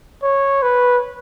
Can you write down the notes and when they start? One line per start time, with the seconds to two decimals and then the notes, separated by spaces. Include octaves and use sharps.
0.23 C#5
0.63 B4